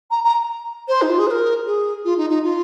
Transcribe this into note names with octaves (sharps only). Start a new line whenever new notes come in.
A#5
A#5
C5
D#4
F4
G#4
C5
A#4
G#4
F4
D#4
D#4
F4